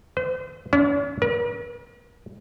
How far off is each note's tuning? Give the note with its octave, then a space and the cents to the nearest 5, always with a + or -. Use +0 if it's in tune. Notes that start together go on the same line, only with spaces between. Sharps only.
C5 -40
C#4 +45
A#4 +45